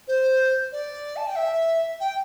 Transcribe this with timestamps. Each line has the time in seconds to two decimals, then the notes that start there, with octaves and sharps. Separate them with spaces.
0.08 C5
0.72 D5
1.17 A5
1.27 G5
1.36 E5
2.00 G5